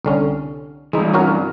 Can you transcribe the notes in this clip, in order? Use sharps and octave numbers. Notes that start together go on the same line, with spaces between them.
C2 D3 C#4
G2 E3 G#3 D#4
C#4 F#4 A#4